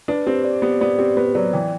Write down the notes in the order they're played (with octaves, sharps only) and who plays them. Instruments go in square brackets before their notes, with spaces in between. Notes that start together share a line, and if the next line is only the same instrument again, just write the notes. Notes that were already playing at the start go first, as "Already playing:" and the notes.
[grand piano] D4 [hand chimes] B4
[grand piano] C4 [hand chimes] G4
[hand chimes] D5
[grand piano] B3 [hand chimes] G4
[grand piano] B3 [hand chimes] D5
[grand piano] C4 [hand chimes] G4
[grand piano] B3 [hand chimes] B4
[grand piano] F#3 [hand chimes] D5
[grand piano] E3 [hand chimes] G5